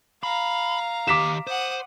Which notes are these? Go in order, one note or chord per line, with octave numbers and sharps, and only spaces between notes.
F5 A#5 B5
D#3 G4 D6 B6 E7
C5 F#5 D#6